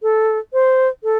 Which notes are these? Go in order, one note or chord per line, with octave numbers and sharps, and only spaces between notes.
A4
C5
A4